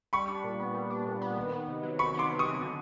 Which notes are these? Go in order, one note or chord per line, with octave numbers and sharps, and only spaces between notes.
G3 B5 C#6
D4
A#2
B3
G3
D4
A#2
B3
D#3
B3
C3
F#3
D#3 B5 C#6
B3 C6 D6
C3
C#6 D#6
F#3
D3